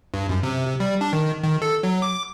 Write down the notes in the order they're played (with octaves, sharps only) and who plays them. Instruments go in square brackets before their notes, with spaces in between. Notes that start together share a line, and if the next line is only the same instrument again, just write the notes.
[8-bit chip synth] G2
F#2
C3
C3
G3
D4
D#3
D#3
A4
F#3
D6